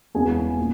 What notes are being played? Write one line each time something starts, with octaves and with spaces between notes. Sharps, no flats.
E1 E2 C#3 G#3 B3 G#4 G#5
A#2